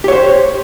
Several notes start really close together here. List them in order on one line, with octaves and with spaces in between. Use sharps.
G4 C#5 C5